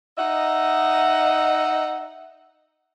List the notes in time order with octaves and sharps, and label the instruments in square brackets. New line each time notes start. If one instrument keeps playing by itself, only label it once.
[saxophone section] D#4 D#5 E5 F#5